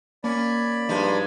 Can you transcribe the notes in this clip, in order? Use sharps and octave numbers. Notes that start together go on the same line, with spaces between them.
A#3 C#4 D5 B5
G2 F3 G#3 D#4